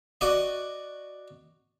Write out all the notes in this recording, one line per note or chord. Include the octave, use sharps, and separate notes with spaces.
F#4 D5 D#5